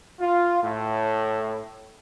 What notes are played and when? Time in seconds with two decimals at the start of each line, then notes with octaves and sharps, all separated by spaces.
0.20 F4
0.63 A2